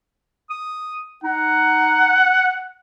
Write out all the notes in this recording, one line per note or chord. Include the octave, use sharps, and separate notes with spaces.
D#6
D#4 F#5